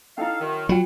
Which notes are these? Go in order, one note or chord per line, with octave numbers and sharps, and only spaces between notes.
C#4 D#4 E4 A4 F5
F#2 D#3
F#3 F4 G5